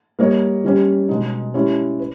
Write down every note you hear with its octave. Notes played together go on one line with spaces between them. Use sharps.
G3 A#3 D#4 A#4 C#5
D#3 G3 C#4 G4
B2 G#3 D#4
G#3 C#4 E4 G4 C#5
B4